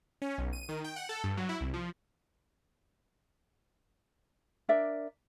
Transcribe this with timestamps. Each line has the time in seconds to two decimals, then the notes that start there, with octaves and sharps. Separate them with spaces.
0.22 C#4
0.38 B1
0.53 D#7
0.69 D#3
0.84 G5
0.96 F#5
1.09 A4
1.24 G2
1.37 F#3
1.49 E4
1.61 C2
1.73 F3
4.69 D4 A#4 D5 E5